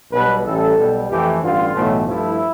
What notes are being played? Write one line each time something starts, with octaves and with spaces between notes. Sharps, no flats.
B1 B2 G3 B4
A1 A2 G3 A4
B1 B2 G3
F2 E3 A3 G4
A1 G2 D3 F4
B1 A2 E3 A3
G2 F3 A3 E4